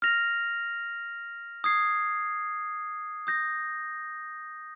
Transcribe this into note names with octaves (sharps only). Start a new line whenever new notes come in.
F6 A#6 F7
D#6 G#6 C7
D#6 G6 A#6